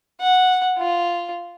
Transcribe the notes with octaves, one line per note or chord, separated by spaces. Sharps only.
F#5
F4